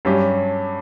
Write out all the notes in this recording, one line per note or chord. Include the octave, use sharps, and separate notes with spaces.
G2 F#3 C#4 G4